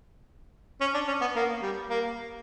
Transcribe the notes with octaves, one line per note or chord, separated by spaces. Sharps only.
C#4
D4
C#4
B3
A#3
G3
A#3